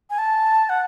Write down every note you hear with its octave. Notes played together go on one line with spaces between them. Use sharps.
G#5
A5
F#5